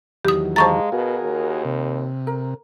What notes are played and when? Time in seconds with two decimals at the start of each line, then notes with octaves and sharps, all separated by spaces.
0.25 E2 D#3 F#3 G4 D#6
0.56 G#3 C5 F5 A5 A#5 C#6 A6
0.92 B2 F#4 G#4 A#4
1.23 D#2
1.65 C3
2.27 A#4